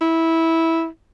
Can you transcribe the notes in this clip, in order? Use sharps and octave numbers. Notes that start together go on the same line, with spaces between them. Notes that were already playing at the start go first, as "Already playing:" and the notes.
E4